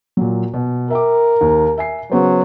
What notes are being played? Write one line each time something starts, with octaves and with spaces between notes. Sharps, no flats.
A#2 F#3
B2
A#4 E5 G5 D6
D#2
E5 G#5 C7
C#3 F#3 B3 C5